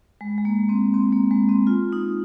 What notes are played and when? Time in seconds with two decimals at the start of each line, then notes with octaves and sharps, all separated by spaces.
0.21 G#3
0.38 G#3
0.45 A#3
0.69 C4
0.94 C4
1.12 A#3
1.31 G#3
1.49 C4
1.67 F4
1.92 D#4